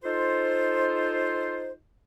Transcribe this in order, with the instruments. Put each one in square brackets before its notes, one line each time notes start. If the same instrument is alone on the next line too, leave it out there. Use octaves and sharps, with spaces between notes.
[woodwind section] D#4 F4 A4 C5